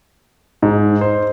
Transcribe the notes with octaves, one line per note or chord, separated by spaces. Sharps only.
G#2
C5